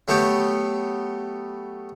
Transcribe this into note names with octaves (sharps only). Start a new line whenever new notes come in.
F#3 A3 B3 G4